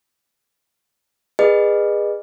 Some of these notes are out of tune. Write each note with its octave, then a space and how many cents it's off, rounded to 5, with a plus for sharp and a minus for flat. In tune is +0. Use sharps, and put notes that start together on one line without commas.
G#4 -20 B4 -15 D#5 -35